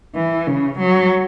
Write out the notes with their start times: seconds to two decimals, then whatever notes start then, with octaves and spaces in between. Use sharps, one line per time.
0.16 E3
0.47 C#3
0.79 F#3